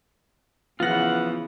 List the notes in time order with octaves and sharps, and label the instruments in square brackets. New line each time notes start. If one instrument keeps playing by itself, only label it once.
[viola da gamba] C#3 E3 [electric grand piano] F3 B3 A#6 [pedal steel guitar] F4 F#5